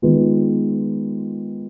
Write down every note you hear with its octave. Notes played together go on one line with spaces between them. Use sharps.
D#3 G#3 B3 F4 B4